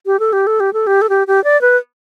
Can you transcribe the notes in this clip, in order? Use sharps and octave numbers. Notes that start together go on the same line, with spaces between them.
G4
A4
G4
A4
G4
A4
G4
A4
G4
G4
D5
B4